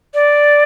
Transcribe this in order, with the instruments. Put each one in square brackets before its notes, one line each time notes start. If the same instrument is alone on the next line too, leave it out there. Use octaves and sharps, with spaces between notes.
[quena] D5